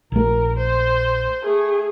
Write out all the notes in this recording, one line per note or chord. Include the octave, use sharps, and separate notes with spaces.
A#1 A3 A#4
C5
A3 G#4